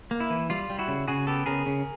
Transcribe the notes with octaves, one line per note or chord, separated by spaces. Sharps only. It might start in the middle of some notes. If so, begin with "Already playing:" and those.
A#3
E4
E3
G3 F4
G3
E4 F#4
C#3
C#3 F#4 G#4
B3 G4 A4
C#3 G#4 A#4
C#3